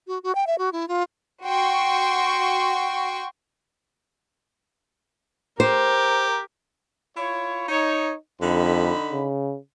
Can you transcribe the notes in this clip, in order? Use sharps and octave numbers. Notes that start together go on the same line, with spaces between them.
F#4
F#4
G5
E5
F#4
E4
F4
F#4 G5 C6 C#6
G4 A#4 C5
E4 F4 C#5
D#4 C#5
F2 D3 D#4 B5
C#3